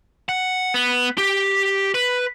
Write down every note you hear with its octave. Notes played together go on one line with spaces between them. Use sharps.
F#5
B3
G4
B4